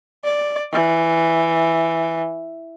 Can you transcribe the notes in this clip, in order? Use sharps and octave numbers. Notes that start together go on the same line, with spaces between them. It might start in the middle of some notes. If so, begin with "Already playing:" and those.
D5
E3